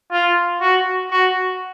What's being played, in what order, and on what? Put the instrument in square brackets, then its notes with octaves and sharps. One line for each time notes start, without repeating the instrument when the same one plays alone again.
[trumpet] F4
F#4
F#4